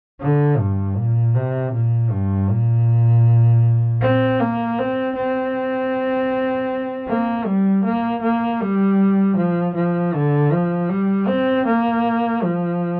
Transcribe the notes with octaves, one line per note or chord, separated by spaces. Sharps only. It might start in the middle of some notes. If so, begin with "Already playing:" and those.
D3
G2
A#2
C3
A#2
G2
A#2
C4
A#3
C4
C4
A#3
G3
A#3
A#3
G3
F3
F3
D3
F3
G3
C4
A#3
F3